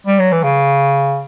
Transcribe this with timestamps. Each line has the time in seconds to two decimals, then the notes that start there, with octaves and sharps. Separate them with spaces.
0.07 G3
0.19 F#3
0.32 E3
0.44 C#3